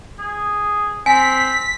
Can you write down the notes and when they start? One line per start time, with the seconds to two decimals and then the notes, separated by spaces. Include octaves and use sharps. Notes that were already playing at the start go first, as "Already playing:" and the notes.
0.19 G#4
1.06 C4 G#5 B6